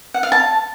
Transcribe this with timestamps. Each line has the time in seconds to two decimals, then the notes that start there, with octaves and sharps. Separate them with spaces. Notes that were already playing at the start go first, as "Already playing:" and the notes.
0.14 F#5
0.23 F5
0.32 A5